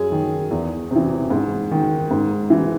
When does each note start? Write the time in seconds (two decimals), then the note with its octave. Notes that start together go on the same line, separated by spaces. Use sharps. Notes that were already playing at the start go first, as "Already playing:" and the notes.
Already playing: F#2 G#4
0.12 D#3
0.51 E2
0.91 C3 E3
1.30 G#2
1.71 D#3
2.11 G#2
2.50 E3